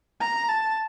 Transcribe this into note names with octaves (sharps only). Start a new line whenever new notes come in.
A#5
A5